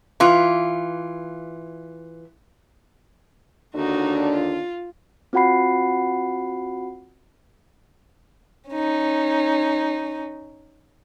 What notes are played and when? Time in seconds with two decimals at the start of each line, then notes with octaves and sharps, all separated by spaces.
0.20 E3 F4
3.74 D#2 D3 D4 D#4 F#4
4.32 F4
5.33 C4 F4 F#4 F#5 B5 C7
8.69 C#4 D#4